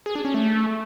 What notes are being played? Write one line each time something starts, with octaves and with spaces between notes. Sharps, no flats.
G#4
D4
C#4
A3